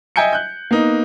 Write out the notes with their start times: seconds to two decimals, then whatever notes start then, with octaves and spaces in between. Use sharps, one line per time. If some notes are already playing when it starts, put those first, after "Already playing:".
0.16 D#5 E5 G5 G#5 G6 C#7
0.33 F#6 G6
0.71 A#3 B3 D#4